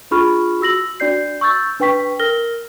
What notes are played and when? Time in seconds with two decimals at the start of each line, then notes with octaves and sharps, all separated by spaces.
0.11 D4 F4 G#4 B5 C#6 F6
0.61 F#4 E6 A#6 F#7
1.00 D4 F#4 D5 G6 C7
1.41 C#6 E6 G6 A6
1.80 D4 B4 G5 C#6 B6
2.19 A#4 F6 A#6 G7